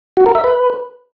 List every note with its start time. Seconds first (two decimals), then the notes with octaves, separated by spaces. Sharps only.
0.17 F#4
0.26 A#4
0.35 E5
0.44 B4